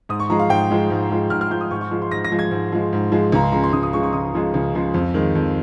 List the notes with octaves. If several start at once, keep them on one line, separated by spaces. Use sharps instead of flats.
G#2 D#6
C#6
F3 G#3 A#5
F5
G#2 G5
F3 G#3
G#2
F3 G#3
G#2 F6
F6
F3 G#3 G6
D#6
G#2 C#6
C#6
F3 G#3
C6
G#2 A#6
A#6
F3 G#3
G#6
G#2
F3 G#3
G#2
F3 G#3
C#2 A#5
C6
C#3 F3 G#3 A#5
C6
C#2 D#6
D#6
C#3 F3 G#3 C#6
C#6
C#2 D#6
C#3 F3 G#3
C#2
C#3 F3 G#3
F2
D#3 G#3
F2